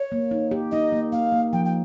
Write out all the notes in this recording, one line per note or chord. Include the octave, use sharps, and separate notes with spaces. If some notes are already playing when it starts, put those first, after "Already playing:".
Already playing: C#5
A#3
D#4
G4
D#4 D#5
A#3
A#3 F5
A#3
F3 G5
G5